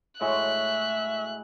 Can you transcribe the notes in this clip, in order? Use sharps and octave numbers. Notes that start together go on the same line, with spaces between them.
A2 G#3 F#4 E5 F#6